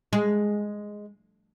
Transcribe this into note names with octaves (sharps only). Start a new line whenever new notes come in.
G#3